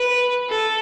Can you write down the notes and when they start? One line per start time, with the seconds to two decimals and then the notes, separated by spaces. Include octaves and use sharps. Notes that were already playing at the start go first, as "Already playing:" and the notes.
Already playing: B4
0.49 A4